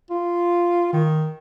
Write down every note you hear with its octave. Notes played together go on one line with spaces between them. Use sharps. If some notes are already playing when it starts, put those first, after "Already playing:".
F4
D#3